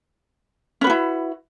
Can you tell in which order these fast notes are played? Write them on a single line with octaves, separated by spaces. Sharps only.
C#4 B4 F#4 E4